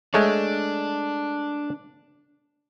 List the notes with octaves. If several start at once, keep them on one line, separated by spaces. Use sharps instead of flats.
G#3 A3 D4 C#5